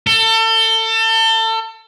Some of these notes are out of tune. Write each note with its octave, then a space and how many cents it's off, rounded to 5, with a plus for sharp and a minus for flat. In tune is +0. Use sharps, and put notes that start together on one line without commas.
A4 +30